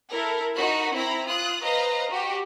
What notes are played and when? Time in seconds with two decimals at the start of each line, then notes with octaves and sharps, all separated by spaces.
0.11 E4 A4 A#4
0.56 D#4 F#4 A#4 B5
0.94 C4 E4 A#5 B5
1.29 F4 D#6 F#6
1.64 B4 C5 D#5 F5 A#5
2.10 F#4 G4